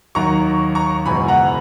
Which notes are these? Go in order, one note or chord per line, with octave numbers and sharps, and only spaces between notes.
D#2 D#3 F#3 A#5 C#6
A#5 C#6
F#1 E2 B2 G#3 G#5 B5
F#5 A#5